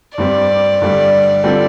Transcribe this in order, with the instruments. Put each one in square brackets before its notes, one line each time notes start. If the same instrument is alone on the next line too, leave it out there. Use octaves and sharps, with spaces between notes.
[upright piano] G2 G3 C4 [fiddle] D5
[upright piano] G2 D3 G3
D3 G3 C4 F4 A4